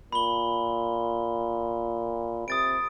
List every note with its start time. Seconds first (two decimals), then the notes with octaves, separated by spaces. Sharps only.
0.12 A#2 B5 G7
2.48 C3 D#6 A6 D7